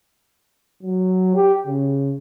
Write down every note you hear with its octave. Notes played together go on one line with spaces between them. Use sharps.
F#3
G4
C#3